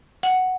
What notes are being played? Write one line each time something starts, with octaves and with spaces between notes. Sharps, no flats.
F#5